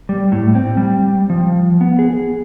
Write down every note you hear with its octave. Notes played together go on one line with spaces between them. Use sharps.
G3
A2
C4
G3
F3
B3
G#4